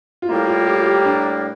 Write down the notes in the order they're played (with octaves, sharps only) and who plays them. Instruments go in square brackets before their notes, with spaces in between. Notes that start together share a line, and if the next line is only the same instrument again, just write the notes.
[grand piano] F4
[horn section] A2 G3 A#3 [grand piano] E4
[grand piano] F4
G4
F4
G4
D4